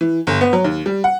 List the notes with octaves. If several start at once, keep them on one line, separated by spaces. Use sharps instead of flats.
E3
G1
B3
F#3
D#2
G3
F#5